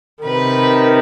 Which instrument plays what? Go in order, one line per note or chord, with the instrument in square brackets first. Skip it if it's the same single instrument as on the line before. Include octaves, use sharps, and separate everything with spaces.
[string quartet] C3 D#3 B4